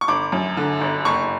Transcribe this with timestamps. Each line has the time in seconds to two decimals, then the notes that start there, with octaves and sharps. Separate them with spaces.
0.01 C#6
0.08 G1 D6
0.32 F#2
0.57 D3
0.81 G1
1.05 F#1 C#6